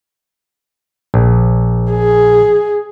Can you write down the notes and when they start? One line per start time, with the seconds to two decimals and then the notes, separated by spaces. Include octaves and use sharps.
1.14 A#1
1.92 G#4